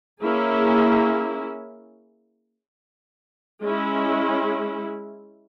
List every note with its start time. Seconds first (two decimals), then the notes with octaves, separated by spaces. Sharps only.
0.21 A#3 C#4 E4 G#4
3.62 G#3 C#4 E4